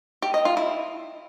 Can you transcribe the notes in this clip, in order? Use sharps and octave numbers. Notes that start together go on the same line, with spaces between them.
G4
D#5
F4
E4